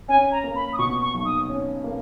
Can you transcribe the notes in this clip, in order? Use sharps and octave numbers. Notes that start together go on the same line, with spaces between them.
C#4 G#5
A#5
A#3
B5
D#6
B2 C#6
C#6
B1
D#6
C#4
A#3